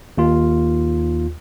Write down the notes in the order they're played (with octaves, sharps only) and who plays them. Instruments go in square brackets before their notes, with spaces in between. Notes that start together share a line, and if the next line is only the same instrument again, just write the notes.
[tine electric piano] D#2 F4